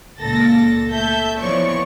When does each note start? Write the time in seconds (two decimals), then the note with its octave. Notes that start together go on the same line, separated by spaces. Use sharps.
0.20 C#2 A#2 A4 A6 A#6
0.90 A3 A4 E5 G6
1.40 E3 F3 B3 C#5 D5 C#6